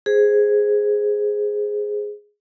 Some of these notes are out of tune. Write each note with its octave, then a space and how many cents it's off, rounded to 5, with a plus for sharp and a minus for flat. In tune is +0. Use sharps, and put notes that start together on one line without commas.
G#4 +0 C5 +0